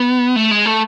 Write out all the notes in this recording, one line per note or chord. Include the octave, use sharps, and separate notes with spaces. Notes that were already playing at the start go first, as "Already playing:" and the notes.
Already playing: B3
A3
G#3
A3